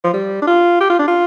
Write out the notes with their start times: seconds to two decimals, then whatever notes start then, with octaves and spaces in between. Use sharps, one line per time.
0.04 F3
0.14 G3
0.42 D4
0.47 F4
0.80 G4
0.90 F4
0.99 D4
1.08 F4